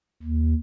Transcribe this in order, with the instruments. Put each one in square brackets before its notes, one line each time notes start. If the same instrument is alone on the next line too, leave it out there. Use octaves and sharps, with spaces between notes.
[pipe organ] D#2